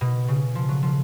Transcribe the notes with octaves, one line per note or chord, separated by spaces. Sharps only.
B2
C#3
F3
F#3
F3